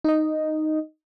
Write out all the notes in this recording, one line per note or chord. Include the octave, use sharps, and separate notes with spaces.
D#4 D#5